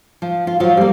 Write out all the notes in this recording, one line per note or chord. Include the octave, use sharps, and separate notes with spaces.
F3
F4
F3 F#3 F4
G3 A#3